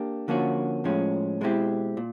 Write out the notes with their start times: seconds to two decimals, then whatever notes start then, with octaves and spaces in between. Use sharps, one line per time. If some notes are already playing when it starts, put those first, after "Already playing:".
Already playing: A#3 D4 G4
0.28 D3 F3 A#3 C#4 F#4
0.84 A2 F3 G#3 C#4
1.41 B2 G#3 C4 E4 G4
1.97 A#2